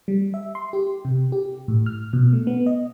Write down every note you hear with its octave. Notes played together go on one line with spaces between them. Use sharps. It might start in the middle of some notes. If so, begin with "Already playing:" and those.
G3
E5
C6
G4
C3
G4
A2
F6
B2
A3
B3
D#5